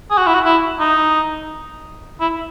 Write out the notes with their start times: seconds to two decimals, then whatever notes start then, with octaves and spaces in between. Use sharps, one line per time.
0.11 G#4
0.18 F#4
0.27 E4
0.34 F#4
0.45 E4
0.80 D#4
2.20 E4